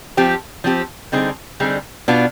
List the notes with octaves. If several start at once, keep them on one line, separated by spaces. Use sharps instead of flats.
F3 C4 G4
F3 C4 G4
D3 G3 C4 D#4 G#4
D3 G3 C4 D#4 G#4
B2 B3 D4 F4